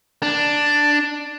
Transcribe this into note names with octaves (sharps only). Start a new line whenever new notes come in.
D4